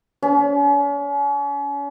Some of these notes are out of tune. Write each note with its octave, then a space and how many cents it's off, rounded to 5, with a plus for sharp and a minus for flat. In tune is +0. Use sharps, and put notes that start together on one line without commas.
C#4 +40